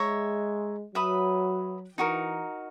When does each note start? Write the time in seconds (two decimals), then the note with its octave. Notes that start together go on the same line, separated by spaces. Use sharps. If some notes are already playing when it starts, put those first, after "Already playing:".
Already playing: G#3 C#5 E5 A#5
0.95 F#3 B4 E5 B5 D#6
1.98 E3 D#4 F#4 A#4